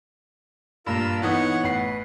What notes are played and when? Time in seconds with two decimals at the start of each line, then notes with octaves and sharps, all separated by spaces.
0.86 G2 A#2 F4 A#4 E6
1.22 E3 B3 D#4 C#5 F#5
1.64 A1 B4 F#5 C7